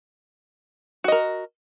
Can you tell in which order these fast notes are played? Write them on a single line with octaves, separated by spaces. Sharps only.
F#4 D#5 A#4